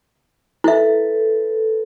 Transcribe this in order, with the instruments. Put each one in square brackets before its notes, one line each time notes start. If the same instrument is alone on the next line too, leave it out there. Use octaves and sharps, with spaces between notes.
[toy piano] E4 E5 [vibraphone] A4 B4